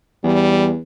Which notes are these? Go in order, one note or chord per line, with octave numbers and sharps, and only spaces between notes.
E2 G3